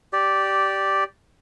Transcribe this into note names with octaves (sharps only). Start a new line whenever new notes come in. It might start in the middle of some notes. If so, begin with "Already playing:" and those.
G4 D5